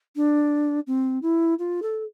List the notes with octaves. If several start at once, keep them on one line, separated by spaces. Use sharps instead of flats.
D4
C4
E4
F4
A4